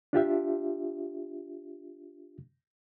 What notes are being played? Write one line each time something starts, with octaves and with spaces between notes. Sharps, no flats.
D4 F4 G4 E5